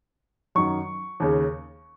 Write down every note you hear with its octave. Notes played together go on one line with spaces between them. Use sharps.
F#2 D#3 C#6
D#2 C#3